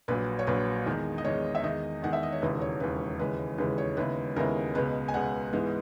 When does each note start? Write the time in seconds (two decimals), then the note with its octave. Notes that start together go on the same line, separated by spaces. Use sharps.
0.08 A#1 A#2 F#3 B4
0.39 C#5
0.47 A#1 A#2 F#3 B4
0.86 E2 D#3 G#3
1.18 D#5
1.24 E2 D#3 G#3 C#5
1.55 E5
1.64 E2 D#3 G#3 D#5
2.03 E2 D#3 G#3 F#5
2.13 E5
2.23 D#5
2.32 C#5
2.42 E1 D#2 C#3 E3 B4
2.61 C#5
2.80 E1 D#2 C#3 E3 B4
3.19 D#2 C#3 E3 G#3 B4
3.58 D#2 C#3 E3 G#3 B4
3.78 C#5
3.97 D#2 C#3 G#3 B3 E4 B4
4.36 D#2 C#3 G#3 B3 E4 A#4
4.75 C#2 B2 G#3 B3 B4
5.08 G#5
5.14 C#2 B2 G#3 B3 F#5
5.53 G#2 E3 G#3 B3